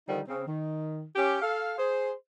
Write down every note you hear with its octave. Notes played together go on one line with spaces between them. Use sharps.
D3 D#3 F3 G3 D#4
C#3 C4
D#3
C#4 G4
A4 F5
G#4 C5